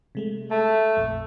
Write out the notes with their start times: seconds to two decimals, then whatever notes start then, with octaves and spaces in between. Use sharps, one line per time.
0.15 C3 G#3 A3
0.51 A3 A5
0.97 A#1 F2